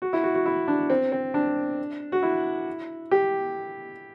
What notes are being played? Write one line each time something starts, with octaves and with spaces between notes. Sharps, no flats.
F#4
E4
F#4
F#4
E4
D4
C4
C4
D4
F#4
E4
G4